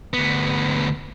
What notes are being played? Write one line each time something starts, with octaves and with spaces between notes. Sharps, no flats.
D2 B3